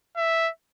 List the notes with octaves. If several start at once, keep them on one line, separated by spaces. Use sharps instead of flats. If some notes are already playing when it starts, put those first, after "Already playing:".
E5